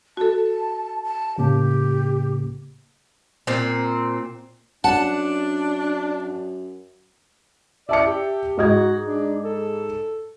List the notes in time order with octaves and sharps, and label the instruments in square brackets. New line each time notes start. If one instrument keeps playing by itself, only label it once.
[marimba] F#4 A4 [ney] A5
[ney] A5
[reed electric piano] A2 C#3 A#3 [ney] G4
[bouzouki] A#2 C4
[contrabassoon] F#2 [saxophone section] D4 [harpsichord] F#5 [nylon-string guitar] A5
[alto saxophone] D5 [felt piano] E5 A5 C#7
[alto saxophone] G4
[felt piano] G#2 D#5 G#6 [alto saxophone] F#4
[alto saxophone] D4
A4